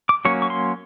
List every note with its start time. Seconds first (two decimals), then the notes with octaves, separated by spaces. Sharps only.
0.09 D6
0.25 F#3 A#3 C#4 C#6
0.42 C#6
0.50 C6